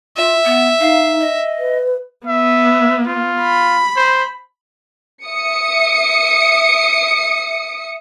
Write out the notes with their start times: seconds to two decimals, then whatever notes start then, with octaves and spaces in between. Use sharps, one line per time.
0.17 F4 E5
0.45 B3
0.81 D#4 F5
1.21 D#5
1.59 B4
2.27 B3 E5
3.07 F4
3.41 B5
3.97 C5
5.23 E5 D#6 C#7